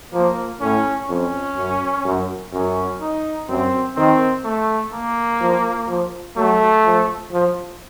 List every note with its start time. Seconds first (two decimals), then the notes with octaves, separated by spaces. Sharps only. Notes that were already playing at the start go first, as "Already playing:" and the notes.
0.13 F3 A#3
0.61 A2 C#4
1.09 F2 C#4
1.57 F#2
2.05 F#2
2.53 F#2 C#4
3.01 D#4
3.49 F#2 C4
3.96 D#3 C4
4.44 A3
4.93 A#3
5.40 F3
5.88 F3
6.37 F#3 A3
6.85 F3
7.32 F3